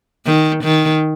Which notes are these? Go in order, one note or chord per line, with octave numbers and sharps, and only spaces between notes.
D#3
D#3